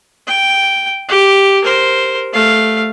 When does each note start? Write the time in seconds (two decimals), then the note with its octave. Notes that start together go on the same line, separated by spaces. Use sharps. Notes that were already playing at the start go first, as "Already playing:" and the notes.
0.27 G5
1.09 G4
1.64 A#4 C5
2.33 A3 F5